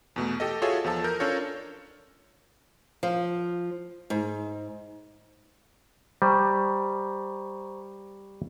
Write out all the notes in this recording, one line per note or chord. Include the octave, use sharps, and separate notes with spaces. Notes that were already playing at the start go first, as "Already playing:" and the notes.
E2 B2 A3
G4 A4 D#5
F4 F#4 G#4 A4 C#5 E5
E2 F3 A4 A5
A#4 G6
C#4 D4 F4 A4 A#4 C#5
F3
G#2
G3 C5 A#5 C#6